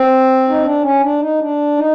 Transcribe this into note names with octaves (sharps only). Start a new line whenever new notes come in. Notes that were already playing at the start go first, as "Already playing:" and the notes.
Already playing: C4
D#4
D4
C#4
D4
D#4
D4
D#4